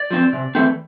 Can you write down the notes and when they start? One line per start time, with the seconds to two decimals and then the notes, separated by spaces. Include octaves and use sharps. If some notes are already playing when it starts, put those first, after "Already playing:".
Already playing: D5
0.11 F3 C4
0.33 C3
0.55 E3 A3 C4